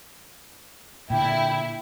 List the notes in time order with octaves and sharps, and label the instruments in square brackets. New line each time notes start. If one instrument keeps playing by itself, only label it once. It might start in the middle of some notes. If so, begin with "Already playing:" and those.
[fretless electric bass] A#2 D3 [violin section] E4 [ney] G5